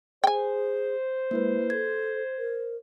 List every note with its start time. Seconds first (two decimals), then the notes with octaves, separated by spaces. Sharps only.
0.24 G#4 C5 G5 G#5
1.31 G#3 A#3 E4 B4
1.70 A4 G#6
2.38 A#4